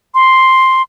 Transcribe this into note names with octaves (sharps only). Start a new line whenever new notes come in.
C6